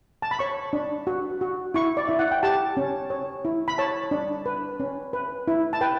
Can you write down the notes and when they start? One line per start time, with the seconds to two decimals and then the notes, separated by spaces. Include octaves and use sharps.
0.22 A5
0.31 B5
0.39 C#5 C#6
0.73 D4
1.07 F#4
1.41 F#4
1.74 E4 C#6
1.97 D5
2.08 E4 E5
2.19 F#5
2.31 G5
2.43 G4 A5
2.77 C#4
3.10 C#5
3.45 E4
3.68 B5
3.78 C#5 A5
4.11 D4
4.46 B4
4.80 C#4
5.13 B4
5.48 E4
5.73 A5
5.81 B4 G5